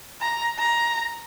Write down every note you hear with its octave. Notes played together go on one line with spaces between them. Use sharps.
A#5
A#5